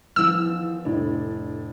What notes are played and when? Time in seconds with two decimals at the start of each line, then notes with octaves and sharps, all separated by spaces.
0.16 E2 D#3 F3 E6
0.85 F1 A2 D4